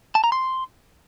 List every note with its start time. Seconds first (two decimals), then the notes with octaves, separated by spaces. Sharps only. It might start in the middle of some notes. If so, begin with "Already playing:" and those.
0.15 A5
0.24 A#5
0.32 C6